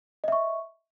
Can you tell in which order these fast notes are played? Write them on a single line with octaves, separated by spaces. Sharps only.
D#5 E5 C#6